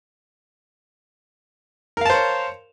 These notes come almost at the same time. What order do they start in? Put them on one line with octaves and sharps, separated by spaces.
A#4 F5 A5 C5 C#5